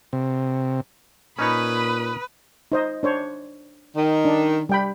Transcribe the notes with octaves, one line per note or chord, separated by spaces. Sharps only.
C3
A#2 C#4 D#4 B4 C#5 B5 D#6
D#4 C5 D#5
D4 C5 C#5
D#3
D4
G3 G5 B5